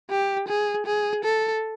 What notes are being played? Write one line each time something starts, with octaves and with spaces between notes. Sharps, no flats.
G4
G#4
G#4
A4